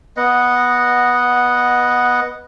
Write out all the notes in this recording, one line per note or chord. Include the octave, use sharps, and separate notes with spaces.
B3 D#5 F#5